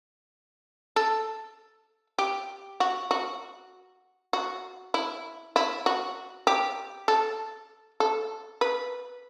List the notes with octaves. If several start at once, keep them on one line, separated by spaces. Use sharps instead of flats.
A4
G4
F#4
F#4
F#4
E4
E4
F#4
G4
A4
A4
B4